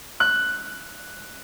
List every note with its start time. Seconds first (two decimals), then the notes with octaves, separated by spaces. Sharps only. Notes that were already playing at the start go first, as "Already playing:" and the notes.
0.20 F#6